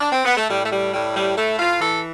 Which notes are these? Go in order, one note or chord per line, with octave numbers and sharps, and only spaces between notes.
D4
C4
B3
A3
A2 G3
A3
G3
A2 G3
G3
A2 A3
F4
E3 A4